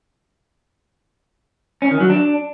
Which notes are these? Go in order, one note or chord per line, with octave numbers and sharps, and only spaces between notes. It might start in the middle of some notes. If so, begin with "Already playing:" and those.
C#4
D#3
F#3
D4